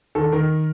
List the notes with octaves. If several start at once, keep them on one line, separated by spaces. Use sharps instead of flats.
D#3 A4
D#3 A#4